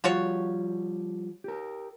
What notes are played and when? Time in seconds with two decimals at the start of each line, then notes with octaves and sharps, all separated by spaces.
0.04 F3 G3 F4 F#4 C#5
1.44 G4 A#4